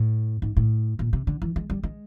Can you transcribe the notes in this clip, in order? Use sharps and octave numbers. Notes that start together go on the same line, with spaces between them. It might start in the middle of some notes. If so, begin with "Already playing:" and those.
Already playing: A2
G#2
A2
A#2
C3
D3
E3
G#3
G3
G#3